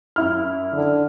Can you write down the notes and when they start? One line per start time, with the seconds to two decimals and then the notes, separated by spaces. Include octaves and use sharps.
0.16 F#2 E4 F6
0.73 D3